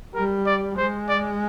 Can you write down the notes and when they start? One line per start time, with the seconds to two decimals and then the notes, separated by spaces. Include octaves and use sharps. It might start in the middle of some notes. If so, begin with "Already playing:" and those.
0.15 G3 A#4
0.46 D5
0.77 G#3 C5
1.09 D5